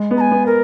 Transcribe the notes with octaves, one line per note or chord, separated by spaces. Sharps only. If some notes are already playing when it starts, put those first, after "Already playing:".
Already playing: G#3
B3
A#5
G#5
B3
A#4